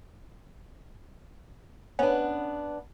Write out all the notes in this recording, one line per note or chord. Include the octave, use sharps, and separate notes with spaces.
B3 C#4 D4 B4